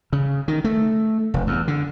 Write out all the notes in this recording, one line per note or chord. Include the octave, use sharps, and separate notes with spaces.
C#3
D#3
A3
F1
E2
D3